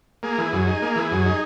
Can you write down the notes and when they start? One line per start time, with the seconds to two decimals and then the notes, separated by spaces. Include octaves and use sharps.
0.23 A#3 G#4
0.38 E3
0.52 F#2
0.67 D#4
0.82 A#3
0.96 E3
1.11 F#2
1.26 D#4